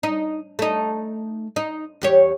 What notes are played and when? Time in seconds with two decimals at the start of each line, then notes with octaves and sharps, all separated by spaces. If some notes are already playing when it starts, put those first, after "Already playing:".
0.03 D#4
0.59 A3 D#4
1.56 D#4
2.02 E2 G4 C#5